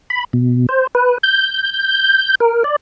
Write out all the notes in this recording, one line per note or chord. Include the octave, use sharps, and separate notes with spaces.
B5
B2
C5
B4
G6
A#4
D5